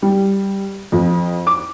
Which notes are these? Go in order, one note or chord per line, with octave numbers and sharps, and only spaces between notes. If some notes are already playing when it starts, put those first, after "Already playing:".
G3
F2
D6